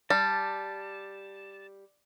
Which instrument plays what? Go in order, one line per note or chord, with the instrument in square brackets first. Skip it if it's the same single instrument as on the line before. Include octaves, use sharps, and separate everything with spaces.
[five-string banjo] G3 [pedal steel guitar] A5